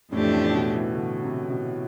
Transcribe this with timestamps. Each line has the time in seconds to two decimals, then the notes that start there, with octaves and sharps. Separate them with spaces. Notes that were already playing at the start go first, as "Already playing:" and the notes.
0.12 F2 A2 E3 A3 D4 G4
0.34 A2
0.54 B2
0.75 E3
0.95 D3
1.23 C3
1.50 B2